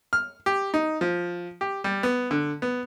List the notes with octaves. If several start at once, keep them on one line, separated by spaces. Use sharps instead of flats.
F6
G4
D#4
F3
G4
G3
B3
D3
B3